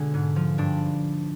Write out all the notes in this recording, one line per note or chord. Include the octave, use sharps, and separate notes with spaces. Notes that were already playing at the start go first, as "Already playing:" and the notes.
Already playing: B2 D3 G#3 D4
G#2
F3
G2 D4